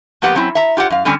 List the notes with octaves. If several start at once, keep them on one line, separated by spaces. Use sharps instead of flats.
F3 A#3 B3 G4 F#5
F#3 C4 C#4 E4
E5 A#5
F4 G4 C#5 F#5
F#2 F5
D3 G3 C4 C#4 G#5